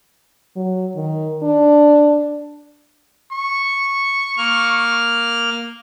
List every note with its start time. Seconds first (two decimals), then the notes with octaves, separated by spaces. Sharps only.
0.56 F#3
0.96 D#3
1.43 D4
3.32 C#6
4.37 A#3 F6